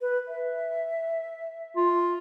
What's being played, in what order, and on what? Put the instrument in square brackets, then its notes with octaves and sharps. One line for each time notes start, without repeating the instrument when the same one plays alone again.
[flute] B4
E5
[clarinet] F4